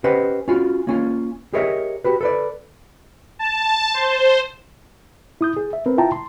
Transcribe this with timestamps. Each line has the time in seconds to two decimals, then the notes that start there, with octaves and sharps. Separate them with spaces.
0.04 C#4 G4 B4 C5 D#5 F#5
0.48 C#4 F4 F#4
0.87 A#3 C#4 F4
1.53 G4 G#4 A#4 C#5 D#5 E5
2.04 F#4 G4 B4
2.21 A4 B4 D5
3.39 A5
3.94 C5
5.41 E4 D#6 G6
5.57 G#4
5.73 E5
5.86 C4 A#4 B4
5.97 E4 F4 E5 G5 A5 A#5
6.12 C6